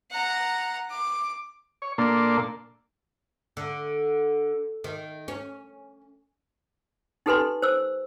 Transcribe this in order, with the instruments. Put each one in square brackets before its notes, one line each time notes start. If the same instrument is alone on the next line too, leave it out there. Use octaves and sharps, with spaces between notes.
[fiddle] F#5 A#5
D6
[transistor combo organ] C#5
A#2 A#3 D4 A4 C6
[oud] D3
D#3
C#4
[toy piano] D#4 G4 A4 B4 G#5 C6
C5 E6